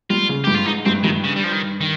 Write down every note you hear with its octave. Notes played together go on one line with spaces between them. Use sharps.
G3 F4
C#3
G2 G4
F4
G#2 D#4
G2 C4
G2 D#3
C#3
G3
F3
D#3
D#3